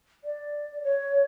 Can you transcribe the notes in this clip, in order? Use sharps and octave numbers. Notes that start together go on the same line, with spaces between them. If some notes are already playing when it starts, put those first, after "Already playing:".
D5
C#5